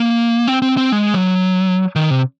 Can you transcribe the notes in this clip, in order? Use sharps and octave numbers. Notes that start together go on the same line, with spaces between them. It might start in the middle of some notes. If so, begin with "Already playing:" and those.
Already playing: A#3
C4
C4
C4
G#3
F#3
D#3
C3